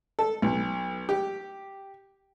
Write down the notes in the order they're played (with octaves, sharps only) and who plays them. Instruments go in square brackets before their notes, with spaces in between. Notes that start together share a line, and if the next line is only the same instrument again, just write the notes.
[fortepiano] A4
B1
G4